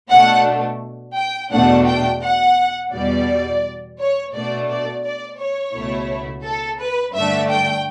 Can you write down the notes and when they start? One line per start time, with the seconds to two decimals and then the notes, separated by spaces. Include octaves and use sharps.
0.11 B2 A3 D4 F#5
1.17 G5
1.52 E2 B2 A3 D4 F#5
1.87 G5
2.22 F#5
2.93 E2 B2 G3 D5
3.99 C#5
4.34 B2 A3 D4 D5
4.69 D5
5.04 D5
5.39 C#5
5.74 C#2 B2 A3 E4
6.45 A4
6.81 B4
7.16 G2 D3 A3 D4 E5
7.51 G5